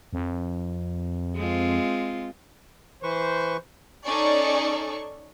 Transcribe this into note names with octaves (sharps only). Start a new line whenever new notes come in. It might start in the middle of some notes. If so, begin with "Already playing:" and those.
F2
G#3 C4 F4
E3 B4 C5 C#6
C#4 D#4 G#4 A4 D5 C#6